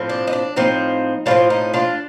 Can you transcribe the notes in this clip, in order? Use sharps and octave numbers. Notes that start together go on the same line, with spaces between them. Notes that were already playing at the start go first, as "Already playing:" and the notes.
Already playing: A2 F3 C4
D4
D#4
D4
A2 F3 C4 D#4
A2 F3 C4 D4 F4
D#4
D4 F4